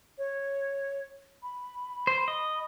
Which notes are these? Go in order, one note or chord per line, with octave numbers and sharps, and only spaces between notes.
C#5
B5
C5
D#5